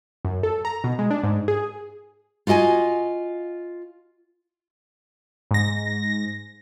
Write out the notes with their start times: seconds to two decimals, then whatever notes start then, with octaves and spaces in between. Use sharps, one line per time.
0.25 F#2
0.43 A4
0.65 A#5
0.84 B2
0.99 G#3
1.11 D4
1.23 G#2
1.48 G#4
2.47 F4 F#4 D#5 G5 G#5
5.51 G#2 A#6